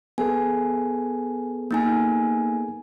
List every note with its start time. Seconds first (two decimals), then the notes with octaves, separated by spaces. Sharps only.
0.18 B3 G#4 A4 G#5
1.71 A#3 D#4 G#5